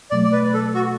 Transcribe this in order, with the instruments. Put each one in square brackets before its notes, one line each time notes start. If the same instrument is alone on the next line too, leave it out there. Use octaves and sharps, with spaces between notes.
[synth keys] B2 F#3 A3 [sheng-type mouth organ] D5
[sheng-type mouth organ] D5
B4
A4
F#4